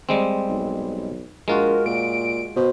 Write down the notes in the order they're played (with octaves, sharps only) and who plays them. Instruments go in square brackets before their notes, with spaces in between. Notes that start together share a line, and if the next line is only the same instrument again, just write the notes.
[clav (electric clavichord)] G3 G#3 C4
[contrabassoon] B1
[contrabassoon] A#1 [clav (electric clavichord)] G#3 F4 F#4 [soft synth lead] A#4
[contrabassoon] A#2 [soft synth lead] D7
[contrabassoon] B2 [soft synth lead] C5